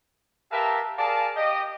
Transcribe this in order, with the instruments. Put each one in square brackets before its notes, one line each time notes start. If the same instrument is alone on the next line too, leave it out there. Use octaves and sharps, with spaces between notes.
[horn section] G4 A#4 B4 E5 F5 A5
G#4 A#4 D5 F5 A5
G4 D#5